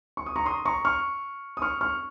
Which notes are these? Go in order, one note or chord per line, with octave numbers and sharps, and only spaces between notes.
C#6
D#6
A#5 C#6
C6 D#6
A#5 C#6
C#6 F6
D#6
C#6 F6
C#6 F6